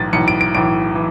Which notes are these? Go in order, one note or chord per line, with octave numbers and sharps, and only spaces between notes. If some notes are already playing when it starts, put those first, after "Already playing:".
Already playing: B1 A2 E3 A6
B1 A2 E3 C#7
D7
D7
B1 A2 E3 D7
E3